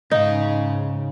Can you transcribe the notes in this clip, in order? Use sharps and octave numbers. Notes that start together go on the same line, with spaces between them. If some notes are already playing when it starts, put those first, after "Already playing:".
G#2 C#3 D#4 F5